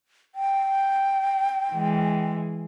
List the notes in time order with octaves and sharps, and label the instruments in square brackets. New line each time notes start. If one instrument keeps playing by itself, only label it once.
[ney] G5
[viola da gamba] E3 G#3